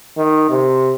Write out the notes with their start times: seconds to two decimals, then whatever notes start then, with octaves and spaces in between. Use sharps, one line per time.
0.17 D#3
0.50 C3